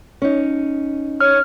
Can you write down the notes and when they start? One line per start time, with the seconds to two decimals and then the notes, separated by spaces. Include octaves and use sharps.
0.22 C#4 D#4
1.20 C#5 F6